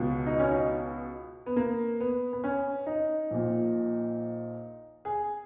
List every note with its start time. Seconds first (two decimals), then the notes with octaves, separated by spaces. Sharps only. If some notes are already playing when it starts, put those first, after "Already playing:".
Already playing: C#2 B2
0.26 D#4
0.39 C#4
0.51 D#4
1.46 B3
1.56 A#3
2.00 B3
2.33 B3
2.44 C#4
2.87 D#4
3.31 A#1 A#2
5.05 G#4